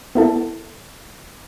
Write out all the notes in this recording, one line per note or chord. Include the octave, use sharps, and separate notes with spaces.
B3 E4 A4